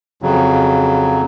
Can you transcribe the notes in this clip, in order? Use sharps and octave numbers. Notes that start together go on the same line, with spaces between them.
F2 C#3 F#3